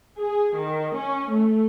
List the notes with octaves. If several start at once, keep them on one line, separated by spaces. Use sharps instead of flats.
G#4
D#3
C#4
A3